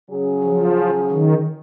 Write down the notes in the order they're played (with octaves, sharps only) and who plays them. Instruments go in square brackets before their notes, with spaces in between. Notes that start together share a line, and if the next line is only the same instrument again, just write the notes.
[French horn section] C#3 F#3 C#4 G#4
[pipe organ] F3
D#3